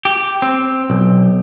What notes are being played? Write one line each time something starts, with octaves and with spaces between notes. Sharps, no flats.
G4
C4
B1